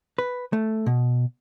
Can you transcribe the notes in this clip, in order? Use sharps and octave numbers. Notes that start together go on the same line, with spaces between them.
B4
A3
B2